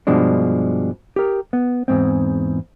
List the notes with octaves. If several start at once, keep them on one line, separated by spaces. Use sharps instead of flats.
G2 B2 F3 G#3 D4
G4 A#4
B3
E2 G#2 C4